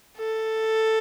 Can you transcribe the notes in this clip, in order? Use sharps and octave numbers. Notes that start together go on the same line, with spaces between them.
A4